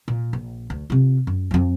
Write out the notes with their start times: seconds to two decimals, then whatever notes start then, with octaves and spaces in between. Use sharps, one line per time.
0.08 A#2
0.33 A#1
0.70 D2
0.90 C3 F4
1.27 F#2
1.51 F2 F3